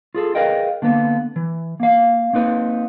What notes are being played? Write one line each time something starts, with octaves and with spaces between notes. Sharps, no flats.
F4 G#4 A4
G#4 A#4 B4 D#5 F5 G5
D3 A#3 B3
E3
A#3 F5
A#3 C4 D#4 B4